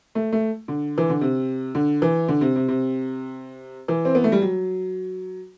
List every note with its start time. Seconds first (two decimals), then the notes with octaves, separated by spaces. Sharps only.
0.15 A3
0.32 A3
0.68 D3
0.98 E3
1.10 D3
1.21 C3
1.75 D3
2.02 E3
2.28 D3
2.41 C3
2.56 C3
2.68 C3
3.88 E3
4.05 C4
4.15 B3
4.24 A3
4.32 G3
4.42 F#3